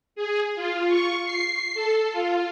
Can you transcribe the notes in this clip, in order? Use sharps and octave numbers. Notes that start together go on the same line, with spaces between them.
G#4
F4
C#6
C7
A4
F4